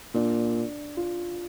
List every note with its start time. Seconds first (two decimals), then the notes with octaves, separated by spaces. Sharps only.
0.15 A#2 D4
0.97 F4